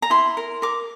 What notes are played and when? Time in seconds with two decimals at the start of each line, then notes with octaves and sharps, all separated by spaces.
0.02 A#5
0.10 E4 C6
0.37 A#4
0.62 A#4 D6